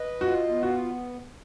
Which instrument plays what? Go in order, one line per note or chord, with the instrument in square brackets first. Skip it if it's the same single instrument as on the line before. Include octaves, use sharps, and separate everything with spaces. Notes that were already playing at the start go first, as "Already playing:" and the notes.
Already playing: [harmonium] B4 D#5
[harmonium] F4 [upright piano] F#4
[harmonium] B3
[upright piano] F#4